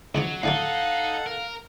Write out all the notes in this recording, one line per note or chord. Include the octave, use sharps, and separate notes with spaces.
C#2 C#3 F3 F#3
A2 D3 F#3 D#4 A4 F5 F#5
A#4